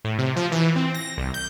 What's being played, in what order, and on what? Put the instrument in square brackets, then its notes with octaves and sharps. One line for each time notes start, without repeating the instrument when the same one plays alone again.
[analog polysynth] A2
C3
F3
E3
C4
A#6
C2
G6